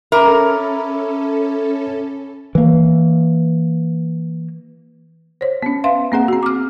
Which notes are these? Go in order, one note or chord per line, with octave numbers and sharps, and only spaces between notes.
C#4 A4 A#4 E5 B5 D6
E3 A#3
C5 C#5
B3 C#4
B4 E5 F5 C6
A#3 C4 G#4 F#5
C4 F#4
D6 F6